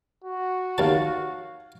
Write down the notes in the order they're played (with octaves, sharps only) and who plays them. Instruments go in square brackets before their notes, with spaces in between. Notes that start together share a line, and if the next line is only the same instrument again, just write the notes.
[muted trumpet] F#4
[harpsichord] D#2 A5 [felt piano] C#5 F5